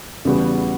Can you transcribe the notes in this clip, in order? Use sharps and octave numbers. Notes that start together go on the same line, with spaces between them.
E2 C#3 G3 B3 F#4